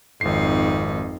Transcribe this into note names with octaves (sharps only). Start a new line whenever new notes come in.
G#1 F2 D#4 C7